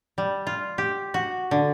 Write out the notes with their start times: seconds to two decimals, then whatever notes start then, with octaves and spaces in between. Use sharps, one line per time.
0.18 G3
0.47 F4
0.78 G4
1.14 F#4
1.51 D3